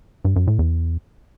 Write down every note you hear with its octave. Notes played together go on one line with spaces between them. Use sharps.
G2
F#2
A2
E2